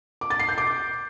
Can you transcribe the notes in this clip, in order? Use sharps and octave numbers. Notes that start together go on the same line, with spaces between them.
D6
A6
C7
G6
D6